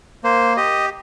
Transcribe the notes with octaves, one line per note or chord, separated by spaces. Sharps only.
A#3 C5
G4 D#5